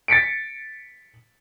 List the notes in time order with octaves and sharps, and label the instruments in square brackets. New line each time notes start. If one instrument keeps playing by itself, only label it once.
[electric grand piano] A6 B6 C#7 D7